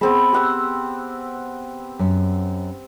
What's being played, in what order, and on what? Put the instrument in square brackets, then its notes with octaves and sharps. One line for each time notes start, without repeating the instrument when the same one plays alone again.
[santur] B3 C4 B5 [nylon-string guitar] G#4 A5
[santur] G4 F#5 E6
[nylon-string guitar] F#2